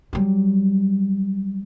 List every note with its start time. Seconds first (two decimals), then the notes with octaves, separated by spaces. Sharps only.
0.13 F#3 G3